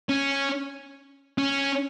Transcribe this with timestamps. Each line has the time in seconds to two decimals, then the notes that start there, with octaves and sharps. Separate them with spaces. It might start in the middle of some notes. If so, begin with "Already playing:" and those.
0.09 C#4
1.38 C#4